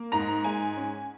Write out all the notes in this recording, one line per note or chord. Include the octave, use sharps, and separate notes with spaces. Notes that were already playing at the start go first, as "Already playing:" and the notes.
Already playing: A#3
G#2 A#5
G#3 G#5
C#4